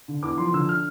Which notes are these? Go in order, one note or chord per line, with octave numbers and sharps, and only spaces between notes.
D3
E2 D6
F3 C6
D3 E6
F6